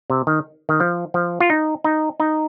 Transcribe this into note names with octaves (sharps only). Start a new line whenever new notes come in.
C3
D#3
D#3
F3
F3
F4
D#4
D#4
D#4